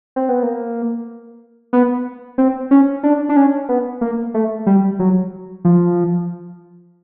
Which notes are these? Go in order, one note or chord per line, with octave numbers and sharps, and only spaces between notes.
C4
B3
A#3
B3
C4
C#4
D4
D4
C#4
B3
A#3
A3
G3
F#3
F3